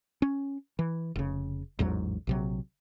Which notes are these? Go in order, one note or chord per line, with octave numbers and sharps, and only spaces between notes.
C#4
E3
F1 C#3
A1 E2 G#2 F#3
A#1 C3 F#3